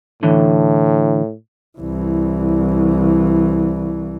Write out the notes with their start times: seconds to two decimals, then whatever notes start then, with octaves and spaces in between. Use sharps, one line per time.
0.23 A2 D3 E3
1.79 C2 E3